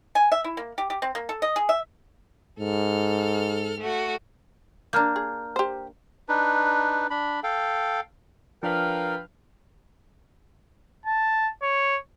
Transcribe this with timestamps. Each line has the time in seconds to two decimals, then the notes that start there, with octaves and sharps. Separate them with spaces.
0.15 G#5
0.32 E5
0.44 E4
0.57 A#3
0.78 G4
0.90 G4
1.02 C4
1.15 A#3
1.29 A4
1.42 D#5
1.56 G#4
1.69 E5
2.60 G#2 A4 F6
3.80 A3 F#4
4.93 A#3 D4 A#5 F6 G6
5.16 G#4
5.56 G4 C5
6.29 D4 D#4 B4
7.10 D4 B5
7.44 A4 F5 G5
8.63 F3 D4 A#4 B4 F5 G5
11.06 A5
11.63 C#5